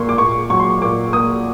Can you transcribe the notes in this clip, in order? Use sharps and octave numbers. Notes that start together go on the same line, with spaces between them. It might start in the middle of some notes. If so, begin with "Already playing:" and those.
Already playing: A#2 A#3 C6 C#6
D6
A#2 C#6
F#3 C#6
C6
C#6
A#2 D6
A#3 D#6